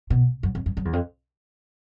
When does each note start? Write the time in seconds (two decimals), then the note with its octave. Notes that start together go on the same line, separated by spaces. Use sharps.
0.10 B2
0.43 F#2
0.55 F2
0.66 F#2
0.77 F#2
0.85 E2
0.93 F2